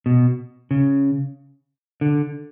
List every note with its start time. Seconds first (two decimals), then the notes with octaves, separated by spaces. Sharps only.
0.06 B2
0.71 C#3
2.01 D3